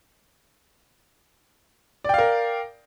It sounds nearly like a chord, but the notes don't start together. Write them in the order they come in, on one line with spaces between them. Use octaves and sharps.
D5 G5 F5 A#4